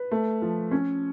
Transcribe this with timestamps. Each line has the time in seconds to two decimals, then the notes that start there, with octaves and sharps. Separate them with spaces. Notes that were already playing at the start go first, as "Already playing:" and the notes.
Already playing: B4
0.11 A3
0.42 F3
0.71 C#4